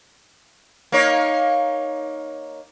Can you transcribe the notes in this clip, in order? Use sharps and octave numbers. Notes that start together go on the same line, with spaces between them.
A#3 D#4 C#5